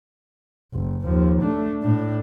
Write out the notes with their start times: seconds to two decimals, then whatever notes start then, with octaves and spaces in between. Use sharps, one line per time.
0.74 F#1
1.04 D#2 F3
1.42 A3 D4
1.83 A2 D4